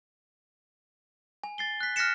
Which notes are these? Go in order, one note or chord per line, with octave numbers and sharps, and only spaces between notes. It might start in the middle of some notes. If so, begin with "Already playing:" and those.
G#5
A6 C7 G7
F#6 B6
F6 F#6 A#6 B6 C#7 E7